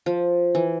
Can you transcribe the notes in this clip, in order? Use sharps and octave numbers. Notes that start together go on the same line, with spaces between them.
F3
E3